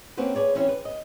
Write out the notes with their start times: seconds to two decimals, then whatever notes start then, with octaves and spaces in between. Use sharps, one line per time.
0.17 A#3 C4 C#4 F#4 B4 C5
0.35 G#4 A#4 B4 C#5 D5
0.55 E3 C4 C#4 E4 C#5 E5
0.69 B4
0.85 D#5